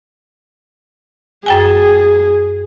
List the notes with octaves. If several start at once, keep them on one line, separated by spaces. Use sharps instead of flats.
F#2 G#4 G5 G#5